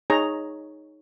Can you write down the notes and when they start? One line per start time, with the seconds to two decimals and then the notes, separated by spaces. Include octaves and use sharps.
0.10 D#4 G#4 C#5 A#5